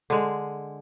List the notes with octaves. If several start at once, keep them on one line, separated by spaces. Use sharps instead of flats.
D3 G#3